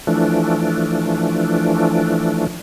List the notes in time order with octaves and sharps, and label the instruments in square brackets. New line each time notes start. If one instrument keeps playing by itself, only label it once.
[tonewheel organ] E3 F3 A3 D4